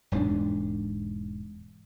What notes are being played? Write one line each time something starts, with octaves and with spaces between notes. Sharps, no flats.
E1 G#2 G3 D4